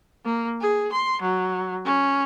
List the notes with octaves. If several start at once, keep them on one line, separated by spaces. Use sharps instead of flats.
A#3
G#4
C6
F#3
C#4